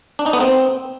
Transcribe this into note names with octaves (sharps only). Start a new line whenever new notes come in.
D4
D#4
B3
C4